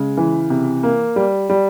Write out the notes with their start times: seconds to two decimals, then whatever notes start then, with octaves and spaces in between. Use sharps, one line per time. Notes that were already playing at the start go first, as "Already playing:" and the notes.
Already playing: C#3 G#3
0.17 E3
0.50 C3
0.83 A#3
1.16 G3
1.49 G3